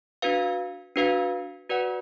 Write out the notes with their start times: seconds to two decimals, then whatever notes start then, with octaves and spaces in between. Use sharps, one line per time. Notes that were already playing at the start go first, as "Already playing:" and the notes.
0.22 D4 F#4 B4 F5
0.96 D4 F#4 B4 F5
1.69 F#4 B4 D5 F#5